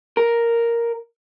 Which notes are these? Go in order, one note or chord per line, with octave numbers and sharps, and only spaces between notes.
A#4